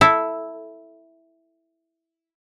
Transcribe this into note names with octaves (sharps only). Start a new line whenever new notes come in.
E4 A4